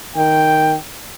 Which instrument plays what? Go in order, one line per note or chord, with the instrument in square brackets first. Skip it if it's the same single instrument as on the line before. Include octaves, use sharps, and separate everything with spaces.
[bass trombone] D#3 [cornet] G5